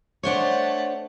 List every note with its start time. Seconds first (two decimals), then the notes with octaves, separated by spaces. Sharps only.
0.23 A3 D4 C5 C#5 F#5